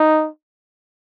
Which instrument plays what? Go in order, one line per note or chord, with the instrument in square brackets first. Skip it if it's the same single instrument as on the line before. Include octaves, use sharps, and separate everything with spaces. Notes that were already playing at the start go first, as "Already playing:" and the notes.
Already playing: [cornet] D#4